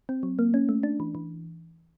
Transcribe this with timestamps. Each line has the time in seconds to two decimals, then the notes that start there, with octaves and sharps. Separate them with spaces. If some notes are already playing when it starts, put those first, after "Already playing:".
0.09 C4
0.23 F#3
0.39 A#3
0.54 C#4
0.69 A3
0.83 D4
1.00 E3
1.15 E3